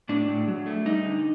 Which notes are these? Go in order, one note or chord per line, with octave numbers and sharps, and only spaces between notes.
A2 D4
A2
F#3
A3
G3 D#4
D3